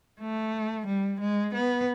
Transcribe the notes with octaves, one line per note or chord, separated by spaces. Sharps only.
A3
G3
G#3
B3